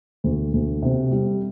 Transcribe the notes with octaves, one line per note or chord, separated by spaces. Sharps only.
D2
D2
C3
G3